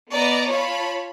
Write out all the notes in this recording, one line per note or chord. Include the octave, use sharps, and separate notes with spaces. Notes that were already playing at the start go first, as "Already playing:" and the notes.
B3 D5 D#5 A#5
F4 C#5 A5 B5